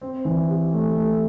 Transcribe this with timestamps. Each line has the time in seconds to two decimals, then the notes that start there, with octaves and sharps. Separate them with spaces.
0.01 C4
0.25 E3
0.49 G4
0.73 A3
0.96 A3